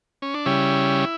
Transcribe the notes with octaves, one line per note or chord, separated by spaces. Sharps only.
C#4
D4
C#3 G3 C#4 E4